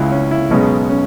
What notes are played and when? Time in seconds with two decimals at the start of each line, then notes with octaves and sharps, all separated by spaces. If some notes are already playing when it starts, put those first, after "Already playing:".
Already playing: C#2 C#3 G#3 E4
0.12 C#4
0.31 E4
0.51 B1 B2 G#3 C#4
0.89 C#4